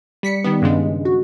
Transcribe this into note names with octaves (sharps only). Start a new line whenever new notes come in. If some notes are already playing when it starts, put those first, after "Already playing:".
G3 B6 C#7
D#3 G3 B3
G2 C#3 G#3
F#4